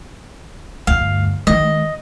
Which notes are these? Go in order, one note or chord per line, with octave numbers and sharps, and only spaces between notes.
D2 G2 F5
D#3 G#3 D#5